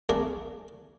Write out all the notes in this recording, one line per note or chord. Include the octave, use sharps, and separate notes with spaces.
A3 A#3 D4 G#4 A#4